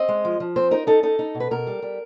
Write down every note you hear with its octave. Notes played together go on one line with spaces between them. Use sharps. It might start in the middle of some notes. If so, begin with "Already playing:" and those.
Already playing: C4 D#5
G#3
F3
F3
C4 C5
D#4 A#4
D#4 A4
D#4 A4
D#4
B2
B4
B2 A#4
G3
G3